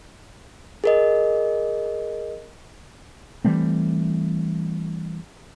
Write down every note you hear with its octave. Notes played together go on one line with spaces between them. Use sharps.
G#4 A#4 D#5
E3 G3 A3 C4